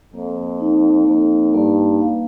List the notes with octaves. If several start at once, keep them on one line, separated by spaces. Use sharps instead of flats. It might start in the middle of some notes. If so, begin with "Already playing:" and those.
F2 A#3
D#4
F2 A#3
G2 A#3
F5